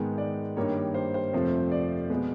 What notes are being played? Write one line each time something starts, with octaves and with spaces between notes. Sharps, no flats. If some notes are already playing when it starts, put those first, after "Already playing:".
Already playing: G#2 D#3 G#3 B3
D5
G2 D#3 G3 A#3 C#5
C5
C5
F2 C3 F3 A3
D5
B2 G#3 B3